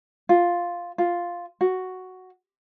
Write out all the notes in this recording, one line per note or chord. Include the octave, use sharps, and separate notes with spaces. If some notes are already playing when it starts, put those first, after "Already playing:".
F4
F4
F#4